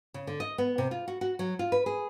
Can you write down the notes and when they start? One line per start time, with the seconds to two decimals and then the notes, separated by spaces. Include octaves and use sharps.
0.14 C#3
0.27 D3
0.40 D#5
0.58 B3
0.78 C3
0.91 F4
1.08 F#4
1.21 F#4
1.39 F#3
1.59 F4
1.72 B4
1.86 G#4